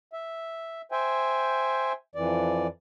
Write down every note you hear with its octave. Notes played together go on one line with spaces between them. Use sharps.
E5
C5 E5 G5 G#5
F2 E3 D5